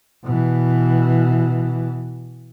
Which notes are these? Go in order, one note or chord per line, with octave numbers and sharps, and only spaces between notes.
B2 E3